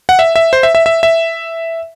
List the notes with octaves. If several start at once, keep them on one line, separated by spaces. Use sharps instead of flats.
F#5
E5
E5
C5
E5
E5
E5
E5